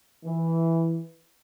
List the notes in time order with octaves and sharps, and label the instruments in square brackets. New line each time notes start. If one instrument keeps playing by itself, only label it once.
[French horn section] E3